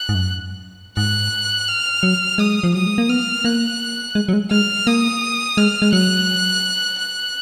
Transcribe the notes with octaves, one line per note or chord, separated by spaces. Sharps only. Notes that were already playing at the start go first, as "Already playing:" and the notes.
Already playing: F#6
G#2
F#2
G#2 F#6
F6
F#3
G#3 D#6
F3
F#3 D#6
G#3
A#3
B3 F6
A#3 F#6
G#3
F#3
G#3
G#3 F6
A#3 D#6
G#3 F6
G#3
F#3 F#6
F#6